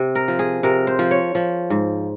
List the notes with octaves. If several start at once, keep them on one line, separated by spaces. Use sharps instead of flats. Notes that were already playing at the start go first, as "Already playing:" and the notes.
Already playing: C3
A#4
F3
G#4
C3 A#4
C5
F3
C#5
F3
G#2